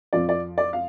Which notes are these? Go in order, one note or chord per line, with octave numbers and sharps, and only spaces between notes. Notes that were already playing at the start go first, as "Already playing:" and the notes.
F2 F3 D5
D5
D5
F5